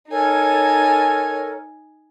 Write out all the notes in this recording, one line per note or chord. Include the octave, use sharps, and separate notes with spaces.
D#4 A4 A#4 C#5 G#5